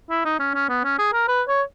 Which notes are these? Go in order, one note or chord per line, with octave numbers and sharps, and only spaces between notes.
E4
D#4
C#4
C#4
B3
C#4
G#4
A#4
B4
C#5